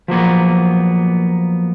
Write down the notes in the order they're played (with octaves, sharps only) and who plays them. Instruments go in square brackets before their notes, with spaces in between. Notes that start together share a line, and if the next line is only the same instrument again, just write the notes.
[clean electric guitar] F3 F#3 A#3 B3